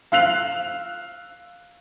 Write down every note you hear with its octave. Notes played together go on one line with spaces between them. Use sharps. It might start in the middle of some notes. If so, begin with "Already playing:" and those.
F5 E6 F#6 C7 F7